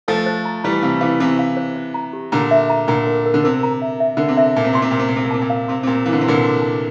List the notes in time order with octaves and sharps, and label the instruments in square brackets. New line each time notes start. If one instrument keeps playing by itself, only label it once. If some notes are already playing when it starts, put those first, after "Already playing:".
[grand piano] F3 A3 [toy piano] C5
[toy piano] C5
A#5
[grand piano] E3 G3 [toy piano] A#5
[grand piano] C3 E3 [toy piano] F5
[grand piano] C3 E3 [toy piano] F5
[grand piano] C3 E3 [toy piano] G4
[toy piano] F5
C5
C5
A#5
G4
[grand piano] A#2 D3 [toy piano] A#5
[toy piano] E5
A#5
[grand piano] A#2 D3 [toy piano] A#5
[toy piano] A#4
A#4
[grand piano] D3
[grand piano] C3 [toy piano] A#4
[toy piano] A#5
E5
E5
[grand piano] D3 [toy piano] A#4
[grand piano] C3
[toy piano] E5
[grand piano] A#2 [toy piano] A5
[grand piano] C3
[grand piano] A#2 [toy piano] C6
[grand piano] C3
[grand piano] A#2 [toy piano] C6
[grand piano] C3
A#2
[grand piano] C3 [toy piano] A#4
[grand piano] A#2
[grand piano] C3 [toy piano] A5
[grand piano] A#2
[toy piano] F5
[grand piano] C3 [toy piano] C6
[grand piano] C3
[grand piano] A#2 [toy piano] C6
[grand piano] E3 [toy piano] F5
[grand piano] D3
C3
[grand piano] A#2 D3 [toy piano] C6
[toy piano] C6
A5